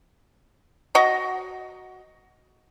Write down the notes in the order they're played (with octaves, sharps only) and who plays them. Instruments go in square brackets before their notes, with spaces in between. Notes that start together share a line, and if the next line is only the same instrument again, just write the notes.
[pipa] F#4 D#5 A#5